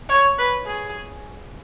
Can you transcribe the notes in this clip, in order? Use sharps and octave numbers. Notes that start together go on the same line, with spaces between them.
C#5
B4
G#4